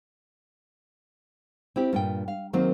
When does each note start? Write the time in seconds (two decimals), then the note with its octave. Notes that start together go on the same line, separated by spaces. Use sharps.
1.76 C4 E4 G4
1.93 G2 A#2 G5
2.28 F5
2.53 D#3 F#3 A#3 C4